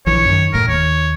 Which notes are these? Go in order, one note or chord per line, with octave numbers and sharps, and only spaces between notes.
A#1 E3 C#5
F#2 D#3
E1 A2 A#4
D#2 C#5